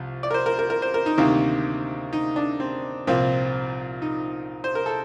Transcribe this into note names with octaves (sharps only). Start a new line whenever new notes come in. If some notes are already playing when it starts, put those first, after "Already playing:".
Already playing: C2 F3
D5
A#4
C5
A#4
A#4
A#4
C5
A#4
D#4
D2 C3 D#3 A#3
D#4
D4
C4
C2 A#2 F3 A#3 C4
D#4
C5
A#4
A4